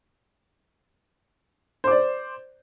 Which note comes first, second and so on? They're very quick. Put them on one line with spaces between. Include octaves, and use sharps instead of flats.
C5 D6 D5